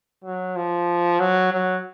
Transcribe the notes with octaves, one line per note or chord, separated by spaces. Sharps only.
F#3
F3
F#3
F#3